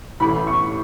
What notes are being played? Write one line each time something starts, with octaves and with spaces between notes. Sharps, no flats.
A1 A2 E3 B5
C#6